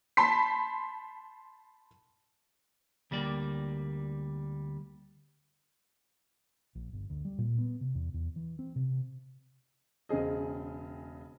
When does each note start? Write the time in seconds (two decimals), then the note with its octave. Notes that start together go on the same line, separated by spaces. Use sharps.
0.17 A5 B5 C6 B6
3.11 D2 G3 A#3 D5
6.75 A#1
6.93 G1
7.10 D2
7.25 G3
7.38 A#2
7.58 B3
7.81 C3
7.95 E2
8.14 E2
8.36 E3
8.59 C4
8.76 C3
10.09 E1 C#3 C4 G#4 D#5